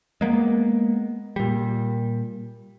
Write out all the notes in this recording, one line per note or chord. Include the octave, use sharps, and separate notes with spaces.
G#3 A#3 B3
A#2 G3